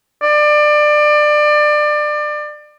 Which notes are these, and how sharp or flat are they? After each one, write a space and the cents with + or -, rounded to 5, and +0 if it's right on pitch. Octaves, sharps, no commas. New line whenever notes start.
D5 +25